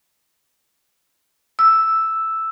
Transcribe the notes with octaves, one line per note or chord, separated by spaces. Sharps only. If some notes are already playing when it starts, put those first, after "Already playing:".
E6